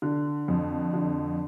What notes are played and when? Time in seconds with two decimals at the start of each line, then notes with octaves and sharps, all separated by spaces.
0.02 D3
0.48 F2
0.94 D3